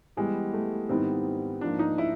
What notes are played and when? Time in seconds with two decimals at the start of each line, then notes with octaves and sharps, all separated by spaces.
0.17 E3 G3 G#3 B3
0.53 A3
0.89 G#2 D#3 G3 B3 C4 E4
1.61 G#2 F3 A#3 D4
1.79 D#4
1.98 E4